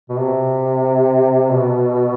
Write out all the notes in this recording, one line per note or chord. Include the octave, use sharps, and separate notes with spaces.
B2
C3
B2